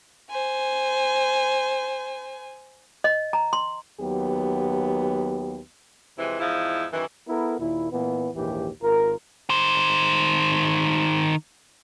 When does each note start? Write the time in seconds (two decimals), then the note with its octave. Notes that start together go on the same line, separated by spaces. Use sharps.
0.31 C5 G#5
3.04 D#5
3.33 A#5
3.53 C6
4.01 D#2 F#3 B3 G4
6.18 F2 C3 E3 G#3 E4
6.40 E2 G#2 F3 D#4 E4
6.92 F#2 D#3 E3
7.29 B3 E4 A4 A#4
7.59 D#2 A#2 E4
7.91 A#2 E3 B3
8.35 A#1 D#2 G#2 E3 G4
8.82 G#1 F4 A#4
9.50 D#3 C5